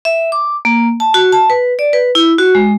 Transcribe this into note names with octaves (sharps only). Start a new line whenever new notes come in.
E5
D6
A#3
A5
F#4
A5
B4
D5
B4
E4
F#4
G#3